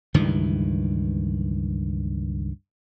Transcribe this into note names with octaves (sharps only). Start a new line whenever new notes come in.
C#2 G2 D#3 E3